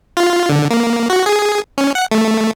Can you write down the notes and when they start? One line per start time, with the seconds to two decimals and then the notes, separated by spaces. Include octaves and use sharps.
0.17 F4
0.49 D3
0.70 A#3
1.10 F#4
1.26 G#4
1.78 C#4
1.95 F#5
2.12 A3